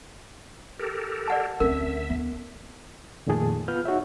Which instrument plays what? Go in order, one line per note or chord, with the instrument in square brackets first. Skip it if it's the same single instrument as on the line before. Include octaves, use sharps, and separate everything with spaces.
[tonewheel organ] G4 A4 A#4
[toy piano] D5 F#5 A5
[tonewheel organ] D2 E5 [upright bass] C4 C#4 [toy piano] A#4
[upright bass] B3
[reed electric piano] F2 A#2 D#3 A3 G#4 A5
B3 F4 B4 F6 G6
D#4 F#4 C#5 E5